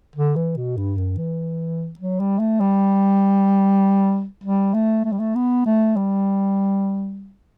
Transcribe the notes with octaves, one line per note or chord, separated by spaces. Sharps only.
D3
E3
B2
G2
F#2
E3
F#3
G3
A3
G3
G3
A3
A3
G3
A3
B3
A3
G3